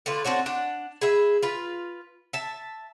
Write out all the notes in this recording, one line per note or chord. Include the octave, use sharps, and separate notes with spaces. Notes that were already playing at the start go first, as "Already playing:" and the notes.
D3 A3 F4 B4
C4 D4 F#4 C#5
D4 F#5
G#4 B4 E5
F4 B4
E5 A5